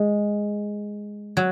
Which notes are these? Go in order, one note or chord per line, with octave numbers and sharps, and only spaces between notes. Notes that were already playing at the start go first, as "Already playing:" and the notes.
Already playing: G#3
F#3